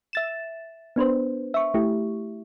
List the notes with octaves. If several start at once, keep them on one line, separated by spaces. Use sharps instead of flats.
E5 A6 E7
B3 D4 B4 C5
E5 C#6
A3 E4 G4